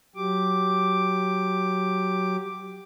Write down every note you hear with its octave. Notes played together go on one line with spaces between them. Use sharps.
F#3 G4 D6